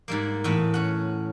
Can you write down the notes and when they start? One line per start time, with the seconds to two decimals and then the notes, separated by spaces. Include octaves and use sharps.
0.08 G#2 G3 A#3
0.44 E2 A2 B3 E5 B5
0.74 C#4 F#5